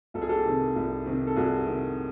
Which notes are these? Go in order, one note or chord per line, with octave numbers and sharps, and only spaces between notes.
C2 A4
G#4
G4 A4
C3 D#3
C2
C3 D#3
A4
C2 F#4 G#4
C3 D#3